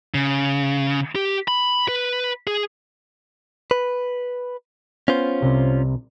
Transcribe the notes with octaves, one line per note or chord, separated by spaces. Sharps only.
C#3
G4
B5
B4
G#4
B4
B3 C#4 F4 C5
C2 C3